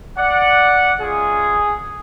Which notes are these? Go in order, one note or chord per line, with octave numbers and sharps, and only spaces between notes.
D5 F#5
G#3 C#4 F4 G#4